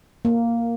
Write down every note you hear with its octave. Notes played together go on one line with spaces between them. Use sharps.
A#3